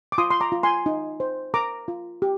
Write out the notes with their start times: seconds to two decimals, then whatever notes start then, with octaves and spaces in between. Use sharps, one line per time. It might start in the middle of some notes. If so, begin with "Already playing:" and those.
0.12 D6
0.18 F4 C6 D#6
0.31 C6
0.40 A#5 D6
0.52 F4
0.63 G#5 C6
0.86 D#4
1.20 C5
1.54 A#4 A#5 D6
1.88 F4
2.22 G4